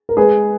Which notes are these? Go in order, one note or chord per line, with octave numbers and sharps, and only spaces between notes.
A#4
G#3 G#4 B4